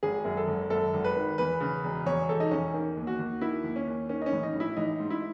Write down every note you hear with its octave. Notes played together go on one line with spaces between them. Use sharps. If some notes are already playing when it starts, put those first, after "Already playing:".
G#1 G#4
F#2
A4
G#1
F#2 A4
G#1
B4
D#3
E2 B4
C#3
E1
E2 C#5
E1 A4
D#4
E2 C#4
D#3
D#2
F#4
D#2
D#3 E4
D#2
C#4
D#2
D#3 C#4
D#4
C#4
A1
D#4
A1
E4
A1 D#4
G#2
E4